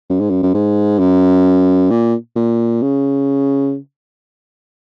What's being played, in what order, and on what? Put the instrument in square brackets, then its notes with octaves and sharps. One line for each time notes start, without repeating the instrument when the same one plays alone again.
[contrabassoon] F#2
G#2
F#2
F#2
G#2
F#2
A#2
A#2
C#3